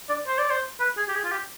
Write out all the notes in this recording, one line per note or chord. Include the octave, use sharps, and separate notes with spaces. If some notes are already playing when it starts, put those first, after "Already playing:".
D5
C5
D5
C5
B4
G#4
G4
G#4
F4
G4